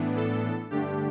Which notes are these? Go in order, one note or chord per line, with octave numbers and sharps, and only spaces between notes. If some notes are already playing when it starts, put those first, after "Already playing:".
Already playing: A2 E3 B3 D4
A4
G2 D3 A3 D4 G4